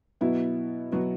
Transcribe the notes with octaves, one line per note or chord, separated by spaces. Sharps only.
B2 F#3 B3 E4
B2 F#3 B3 F#4